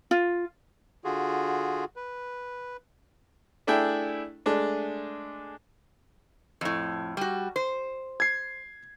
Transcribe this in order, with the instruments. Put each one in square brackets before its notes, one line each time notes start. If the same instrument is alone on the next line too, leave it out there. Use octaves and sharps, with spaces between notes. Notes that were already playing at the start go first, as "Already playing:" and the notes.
[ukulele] F4
[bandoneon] D3 F4 F#4 G#4
B4
[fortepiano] A3 D4 E4 G#4 G5
G#3 A3 D4
[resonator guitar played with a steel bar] F2 A2
G3 F#4
C5
[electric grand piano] G#6 C7